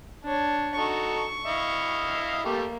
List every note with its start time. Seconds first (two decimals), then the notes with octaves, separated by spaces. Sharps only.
0.24 D4 C#5
0.78 D#4 F#4 A4 C#6
1.45 E4 D#5 F5
2.45 G3 A3 A#3 G4